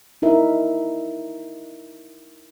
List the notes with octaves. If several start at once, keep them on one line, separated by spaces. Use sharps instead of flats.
D#4 E4 A#4 E5